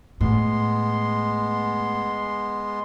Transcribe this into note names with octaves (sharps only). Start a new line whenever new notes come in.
A2 G#3 B3 C6